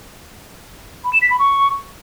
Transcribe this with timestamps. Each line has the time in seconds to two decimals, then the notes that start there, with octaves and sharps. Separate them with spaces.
1.04 B5
1.13 E7
1.22 B6
1.30 B5
1.39 C#6